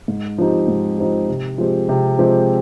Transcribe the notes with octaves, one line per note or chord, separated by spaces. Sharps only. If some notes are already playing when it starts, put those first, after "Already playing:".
G#2
F3 C4 D#4 G4
G#2
F3 C4 D#4 G4
C3
F3 G#3 C4 G4
C3
F3 G#3 C4 G4